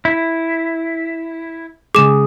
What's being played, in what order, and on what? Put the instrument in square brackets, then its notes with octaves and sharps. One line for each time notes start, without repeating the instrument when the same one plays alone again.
[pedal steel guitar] E4
[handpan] C#3 G#3 G#4 [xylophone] D6 E7